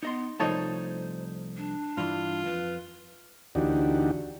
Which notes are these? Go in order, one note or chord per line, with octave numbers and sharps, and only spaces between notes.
B3 D#4 D#5 C6
C2 F3 A3 D#4 C5 C#5 A5
D4
G2 E3 F4
F2 B4
D2 E3 D4 D#4 F#4 G4